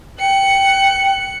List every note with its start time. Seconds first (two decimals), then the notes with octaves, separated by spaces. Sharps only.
0.20 G5 F#6 C#7